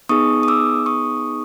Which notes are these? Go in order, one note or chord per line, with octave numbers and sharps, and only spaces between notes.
B3 D#4 G#4 C#6 D#6
D#6
D6 E6
C#6 D#6